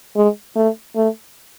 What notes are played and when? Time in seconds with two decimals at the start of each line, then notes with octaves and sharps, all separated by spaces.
0.16 G#3
0.56 A3
0.96 A3